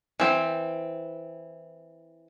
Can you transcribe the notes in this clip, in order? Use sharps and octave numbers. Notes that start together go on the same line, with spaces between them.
E3 C4